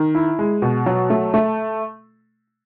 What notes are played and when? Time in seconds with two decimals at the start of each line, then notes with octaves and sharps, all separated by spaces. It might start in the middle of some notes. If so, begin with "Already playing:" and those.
Already playing: D#3
0.15 E4
0.39 G#3
0.62 B2
0.86 F#3
1.10 A3
1.34 A3